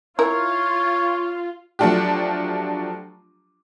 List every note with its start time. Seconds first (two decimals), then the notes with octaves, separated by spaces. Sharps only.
0.19 E4 F4 A#4 C#5
1.79 F3 F#3 A3 D4 F4 G4